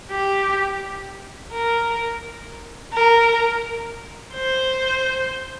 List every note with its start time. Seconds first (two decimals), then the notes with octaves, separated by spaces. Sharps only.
0.11 G4
1.52 A#4
2.93 A#4
4.34 C5